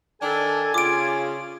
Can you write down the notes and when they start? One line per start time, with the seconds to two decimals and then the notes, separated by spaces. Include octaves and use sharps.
0.22 D#3 D4 A4 G#5
0.74 C#3 F4 D6 D7